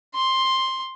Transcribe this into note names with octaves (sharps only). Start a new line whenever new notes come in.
C6